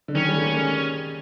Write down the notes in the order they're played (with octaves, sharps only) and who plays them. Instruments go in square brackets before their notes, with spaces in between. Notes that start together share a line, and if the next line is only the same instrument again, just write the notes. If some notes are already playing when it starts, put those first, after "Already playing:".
[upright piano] D3
[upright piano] D#3 [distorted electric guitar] C#4
[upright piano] G3
A3
A#3
G#3